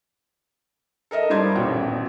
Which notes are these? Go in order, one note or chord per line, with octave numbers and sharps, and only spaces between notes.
A4 A#4 D#5 E5
G2 G3 C5 D5 C6 G#6
D#1 A1 B2 F#4 G5